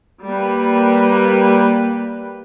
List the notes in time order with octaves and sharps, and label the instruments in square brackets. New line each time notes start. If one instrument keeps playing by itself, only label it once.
[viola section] G3 A#3 G4 B4